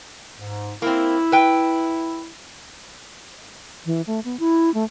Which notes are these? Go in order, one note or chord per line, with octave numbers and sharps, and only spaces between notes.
G#2
A#3 C4 E4
B4 G5
E3
A3
B3
E4
A3